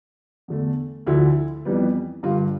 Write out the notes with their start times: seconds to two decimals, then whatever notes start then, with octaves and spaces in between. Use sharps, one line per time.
0.48 E2 D3 A3
1.07 D2 D3 F3 E4
1.65 F2 E3 G3 B3
2.23 G2 D3 G3 F4